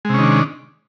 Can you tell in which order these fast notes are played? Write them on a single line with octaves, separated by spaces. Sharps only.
G#3 C3 C#4 D#3 D4